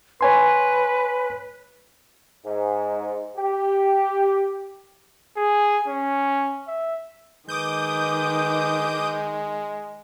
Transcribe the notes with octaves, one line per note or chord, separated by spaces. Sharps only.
B4 C#5 G#5 C6
G#2
G4
G#4
C#4
E5
D#3 G#3 B4 D6 D#6 G6